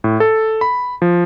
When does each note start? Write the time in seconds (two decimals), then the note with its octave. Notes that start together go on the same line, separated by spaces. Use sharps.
0.04 A2
0.20 A4
0.61 B5
1.02 F3